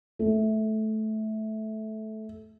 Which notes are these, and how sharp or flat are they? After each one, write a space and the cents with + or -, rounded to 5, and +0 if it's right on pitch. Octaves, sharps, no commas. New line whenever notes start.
A3 -15